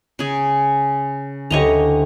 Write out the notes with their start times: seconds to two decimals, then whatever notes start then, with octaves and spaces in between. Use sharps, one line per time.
0.19 C#3 G#4
1.50 D2 E4 G4 C#5 D#5 A#5